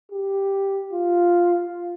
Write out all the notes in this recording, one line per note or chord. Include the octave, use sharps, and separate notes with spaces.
G4
F4